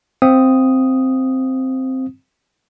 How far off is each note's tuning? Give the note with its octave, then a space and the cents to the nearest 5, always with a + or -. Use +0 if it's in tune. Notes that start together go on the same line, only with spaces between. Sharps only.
C4 +0 F5 +0 D#6 +0